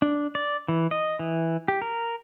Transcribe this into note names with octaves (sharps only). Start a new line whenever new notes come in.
D4
D5
E3
D#5
E3
G4
A#4